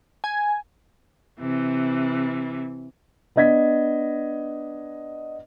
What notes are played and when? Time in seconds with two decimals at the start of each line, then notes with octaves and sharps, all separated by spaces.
0.24 G#5
1.40 C3 E3
3.36 B3 D4 D#5 G#6 B6